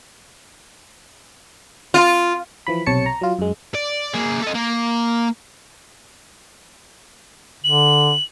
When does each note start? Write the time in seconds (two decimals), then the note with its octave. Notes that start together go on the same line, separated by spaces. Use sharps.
1.94 F4
2.67 E3 F3 B5
2.86 B1 C3 C#5 A5 C#7
3.06 A#5
3.21 F#3 F4
3.39 F#2 G#3
3.75 D5
4.14 A#3 G#4
4.43 A4 D#5
4.55 A#3
7.64 D3 F#7